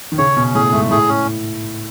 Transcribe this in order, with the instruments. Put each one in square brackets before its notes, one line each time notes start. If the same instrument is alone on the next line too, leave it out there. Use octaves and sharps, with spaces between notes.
[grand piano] D#3
[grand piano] C#3 [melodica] C#5
[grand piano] B2 [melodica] C#4
[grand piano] A2 [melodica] G#4
[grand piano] G#2 [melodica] A3
[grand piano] A2 [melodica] G#4
[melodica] C#4